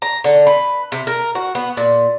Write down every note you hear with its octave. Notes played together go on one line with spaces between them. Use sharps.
A#5
D3
B4
C3
A#4
F#4
B3
A#2